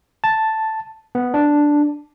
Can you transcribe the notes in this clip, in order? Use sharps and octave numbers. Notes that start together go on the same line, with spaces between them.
A5
B3
D4